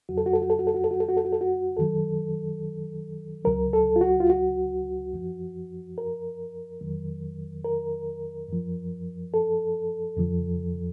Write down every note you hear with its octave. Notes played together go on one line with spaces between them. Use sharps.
F2 C#3 F#3 F#4
A4
F#4
A4
F#4
A4
F#4
A4
F#4
A4
F#4
A4
F#4
A4
F#4
A4
F#4
F#2 D#3 F#3 A4
C#2 C#3 F#3 A#4
A4
F4
F#4
F4
F#4
F#2 F3
A#4
F2 D#3 F#3
A#4
F#2 F3
A4
F2 C#3 F3